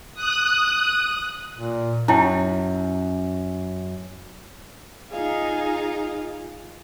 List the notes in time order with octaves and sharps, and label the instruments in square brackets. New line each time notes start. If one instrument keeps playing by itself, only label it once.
[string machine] D#6 F#6
[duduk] A#2
[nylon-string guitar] F#2 [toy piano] D#4 E4 G5
[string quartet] D#4 F4 G#4 F5